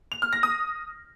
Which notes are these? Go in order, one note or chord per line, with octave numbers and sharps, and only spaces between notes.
F7
F6
A#6
D#6